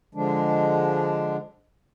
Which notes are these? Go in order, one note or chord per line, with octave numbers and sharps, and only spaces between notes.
D3 F3 G#3 D4